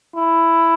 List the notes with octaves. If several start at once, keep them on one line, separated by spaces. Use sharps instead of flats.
E4